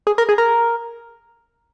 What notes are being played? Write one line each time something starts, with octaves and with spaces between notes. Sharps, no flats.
G#4
A#4
G#4
A#4